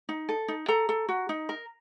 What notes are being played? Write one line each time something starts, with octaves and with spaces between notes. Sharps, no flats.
D#4
A4
D#4
A4 A#5
A4
F#4
D#4
A#4